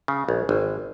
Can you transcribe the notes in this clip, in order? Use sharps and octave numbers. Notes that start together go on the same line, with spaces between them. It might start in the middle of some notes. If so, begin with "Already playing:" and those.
C#3
A#1
G#1